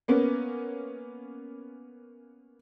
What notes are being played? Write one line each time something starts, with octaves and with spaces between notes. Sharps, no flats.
A#3 B3 C#4